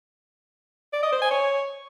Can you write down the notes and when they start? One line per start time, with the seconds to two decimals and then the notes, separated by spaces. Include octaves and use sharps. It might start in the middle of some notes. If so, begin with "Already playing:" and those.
0.93 D5
1.03 D#5
1.12 C5
1.22 G#5
1.31 C#5